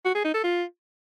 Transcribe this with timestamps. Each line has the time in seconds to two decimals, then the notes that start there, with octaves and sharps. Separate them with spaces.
0.05 F#4
0.15 G#4
0.25 D#4
0.34 A4
0.44 F4